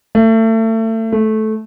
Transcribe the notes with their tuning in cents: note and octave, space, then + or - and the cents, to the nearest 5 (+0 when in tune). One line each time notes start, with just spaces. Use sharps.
A3 +30
A3 -15